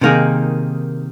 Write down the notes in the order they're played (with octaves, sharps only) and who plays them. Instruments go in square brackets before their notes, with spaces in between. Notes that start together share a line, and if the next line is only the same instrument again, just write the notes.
[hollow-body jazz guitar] C3 D#3 A#3 D#4 G#4